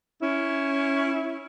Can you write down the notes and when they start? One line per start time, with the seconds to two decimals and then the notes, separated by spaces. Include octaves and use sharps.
0.22 C#4 E4